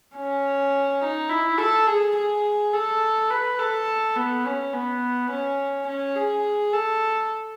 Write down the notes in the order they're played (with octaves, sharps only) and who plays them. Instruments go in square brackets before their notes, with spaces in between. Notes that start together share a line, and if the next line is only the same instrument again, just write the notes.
[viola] C#4
D#4
E4
A4
G#4
G#4
A4
B4
A4
B3
C#4
B3
C#4
C#4
G#4
A4